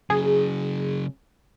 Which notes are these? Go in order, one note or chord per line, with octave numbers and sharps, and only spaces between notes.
C#3 F#3 G#4